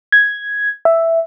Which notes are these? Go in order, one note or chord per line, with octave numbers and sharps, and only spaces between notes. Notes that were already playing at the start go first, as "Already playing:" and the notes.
G#6
E5